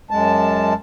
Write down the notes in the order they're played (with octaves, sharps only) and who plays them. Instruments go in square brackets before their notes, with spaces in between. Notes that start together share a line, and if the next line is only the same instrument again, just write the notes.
[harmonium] F#2 G#3 A5